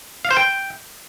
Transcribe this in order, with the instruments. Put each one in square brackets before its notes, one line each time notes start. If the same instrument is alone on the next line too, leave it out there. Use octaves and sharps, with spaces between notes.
[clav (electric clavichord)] F5
C5
G5